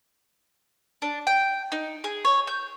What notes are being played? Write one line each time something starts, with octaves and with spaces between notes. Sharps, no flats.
D4
G5
D#4
G#4
C#5
G6